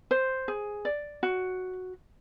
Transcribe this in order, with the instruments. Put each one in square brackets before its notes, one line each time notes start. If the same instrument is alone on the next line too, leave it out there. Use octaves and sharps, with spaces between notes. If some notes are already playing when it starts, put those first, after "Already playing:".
[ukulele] C5
G#4
D5
F#4